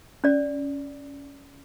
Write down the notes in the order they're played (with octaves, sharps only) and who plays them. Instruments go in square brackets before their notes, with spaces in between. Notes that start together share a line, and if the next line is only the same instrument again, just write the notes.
[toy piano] C#4 D5